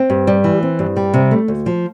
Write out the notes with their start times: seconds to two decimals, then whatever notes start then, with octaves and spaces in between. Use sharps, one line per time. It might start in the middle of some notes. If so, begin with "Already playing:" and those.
Already playing: C4
0.10 G2
0.27 G3
0.44 E3
0.63 C4
0.79 G2
0.97 G3
1.14 C3
1.31 A3
1.48 D2
1.66 F3